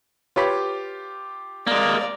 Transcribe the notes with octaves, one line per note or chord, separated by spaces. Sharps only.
F4 G4 B4 C#5 B5
G#3 A#3 D5 A#5